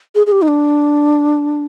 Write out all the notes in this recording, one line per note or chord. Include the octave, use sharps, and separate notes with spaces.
G#4
G#4
G4
D#4
D4